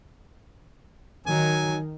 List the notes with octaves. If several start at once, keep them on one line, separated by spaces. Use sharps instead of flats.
D#3 F#3 G#5